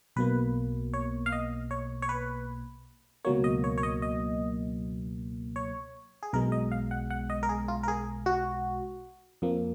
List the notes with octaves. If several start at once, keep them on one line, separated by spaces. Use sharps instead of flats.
B1 B2 A#3 B4
C#5
F5
D#5
C#5
C#5
B4
C#2 B2 F#3 A#3 C#5
D#5
C#5
C#5
D#5
D#5
C#5
G#4
B1 B2 G#3 A#4
D#5
F5
F#5
F#5
D#5
A#4
G#4
F4
A#4
G#4
F#4
F2 F3 A#3